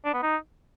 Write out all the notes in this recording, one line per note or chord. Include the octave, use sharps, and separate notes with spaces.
D4
B3
D#4